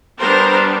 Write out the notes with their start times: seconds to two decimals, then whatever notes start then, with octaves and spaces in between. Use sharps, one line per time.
0.18 G3 B3 D4 A#4 C5